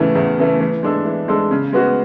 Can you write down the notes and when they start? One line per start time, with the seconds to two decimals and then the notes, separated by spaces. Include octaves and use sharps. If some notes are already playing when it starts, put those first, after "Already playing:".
Already playing: E2 C#3 E3 A3
0.15 E2
0.38 C#3 E3 A3
0.60 E3
0.83 G#3 D4 A4
1.05 E3
1.28 G#3 D4 A4
1.51 C#3
1.73 G#3 B3 F#4